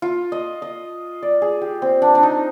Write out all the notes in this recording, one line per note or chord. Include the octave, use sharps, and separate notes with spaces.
F4
D#5
D#5
D5
G#4
G4
C4
D4
D4
D#4